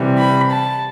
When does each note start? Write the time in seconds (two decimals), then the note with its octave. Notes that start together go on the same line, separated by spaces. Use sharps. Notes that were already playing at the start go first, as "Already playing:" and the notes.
Already playing: C3 E3 G3
0.17 B5
0.51 A5